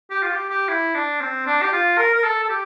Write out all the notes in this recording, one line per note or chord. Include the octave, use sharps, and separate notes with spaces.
G4
F4
G4
G4
E4
D4
C4
D4
G4
F4
A#4
A#4
A4
A4
G4